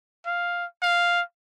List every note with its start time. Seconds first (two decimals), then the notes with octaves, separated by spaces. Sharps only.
0.26 F5
0.82 F5